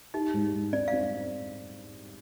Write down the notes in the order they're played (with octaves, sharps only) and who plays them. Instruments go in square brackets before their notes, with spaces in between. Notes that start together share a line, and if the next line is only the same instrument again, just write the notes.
[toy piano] D#4 [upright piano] G4
[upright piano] G#2
G#2
[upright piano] C4 [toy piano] D5
[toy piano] F5
[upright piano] C4